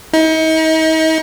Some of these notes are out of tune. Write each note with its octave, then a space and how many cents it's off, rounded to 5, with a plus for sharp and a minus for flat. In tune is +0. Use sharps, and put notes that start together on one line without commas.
D#4 +40